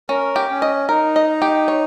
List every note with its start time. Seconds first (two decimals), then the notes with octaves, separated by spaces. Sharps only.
0.09 C#4 A#4
0.36 G4
0.50 C#4
0.62 D#5
0.89 D#4 A#4
1.16 D#5
1.42 G4
1.68 C#5